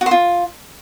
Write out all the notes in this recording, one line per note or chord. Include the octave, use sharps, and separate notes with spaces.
F#4
C5
F4